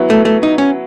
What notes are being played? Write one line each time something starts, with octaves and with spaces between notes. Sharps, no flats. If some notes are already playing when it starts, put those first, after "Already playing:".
Already playing: F#3 B3 E4
A3
A3
D#4
C#4